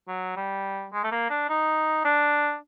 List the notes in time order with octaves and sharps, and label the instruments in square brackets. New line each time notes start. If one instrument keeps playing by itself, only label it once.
[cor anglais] F#3
G3
G#3
A3
A#3
D4
D#4
D4